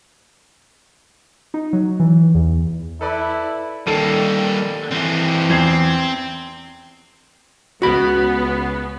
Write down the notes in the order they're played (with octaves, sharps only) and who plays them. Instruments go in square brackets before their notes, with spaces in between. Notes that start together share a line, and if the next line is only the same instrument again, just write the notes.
[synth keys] D#4
F#3
E3
E2
[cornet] E4 [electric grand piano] A4 B4 D5
[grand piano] D#3 A4 D#7 [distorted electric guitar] G3 A#3
[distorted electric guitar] E3 C4
[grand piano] E2 G#6 C7 [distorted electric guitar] C4
[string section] C#2 C#3 B3 [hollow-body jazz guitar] F#4 B5